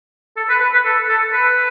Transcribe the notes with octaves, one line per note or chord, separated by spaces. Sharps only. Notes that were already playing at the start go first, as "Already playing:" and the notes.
A4
B4
B4
B4
A4
A4
B4